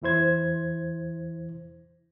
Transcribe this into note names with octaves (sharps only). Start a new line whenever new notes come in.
E2 E3 E4 C5 G#6